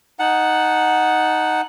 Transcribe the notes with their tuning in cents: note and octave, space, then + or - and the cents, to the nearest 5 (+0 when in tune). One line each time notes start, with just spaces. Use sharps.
D#4 +0 F#5 +0 A5 -25